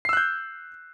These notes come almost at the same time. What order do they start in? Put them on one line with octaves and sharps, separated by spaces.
C7 E6 F#6 G6